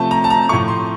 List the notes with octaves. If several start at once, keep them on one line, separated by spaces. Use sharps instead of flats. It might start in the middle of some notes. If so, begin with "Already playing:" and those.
Already playing: C3 F3 A3 A5
A#5
A5
A#5
A2 F3 A3 C#6
C6